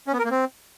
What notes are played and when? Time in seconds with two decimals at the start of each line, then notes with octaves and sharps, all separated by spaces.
0.07 C#4
0.13 B3
0.19 A#4
0.25 A#3
0.31 C4